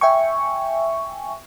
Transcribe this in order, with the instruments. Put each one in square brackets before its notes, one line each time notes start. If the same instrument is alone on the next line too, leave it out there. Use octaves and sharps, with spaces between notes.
[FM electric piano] E5 G5 G#5 C#6